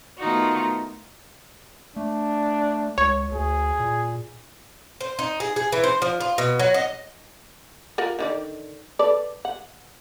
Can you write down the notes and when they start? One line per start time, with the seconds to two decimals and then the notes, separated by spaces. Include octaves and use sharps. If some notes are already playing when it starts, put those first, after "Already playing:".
0.19 D#3 A3 B3 D#4 F4 F#4
1.96 A3 D4
2.98 C#2 C#5
3.32 D2 G#4
3.80 A#2
5.01 C5
5.19 D#4
5.40 G#4
5.56 G#4
5.72 E3
5.84 C5
6.02 F3
6.20 F4
6.38 B2
6.59 F#3
6.74 D#5
7.98 F4 A#4 F#5
8.19 D3 D#3 D5
8.99 A4 B4 D5
9.45 F#5